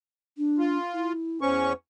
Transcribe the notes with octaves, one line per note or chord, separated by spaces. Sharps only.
D4
F4
E4
E2 C#4 C5 C#6